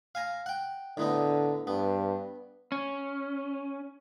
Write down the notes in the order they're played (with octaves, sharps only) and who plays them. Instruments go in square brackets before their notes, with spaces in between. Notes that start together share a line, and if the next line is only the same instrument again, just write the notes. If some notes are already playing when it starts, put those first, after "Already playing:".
[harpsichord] F5 G#5 A#5
F#5 G5
[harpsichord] A2 B3 D#4 [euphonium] D3
[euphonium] G2 [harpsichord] B3
[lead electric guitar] C#4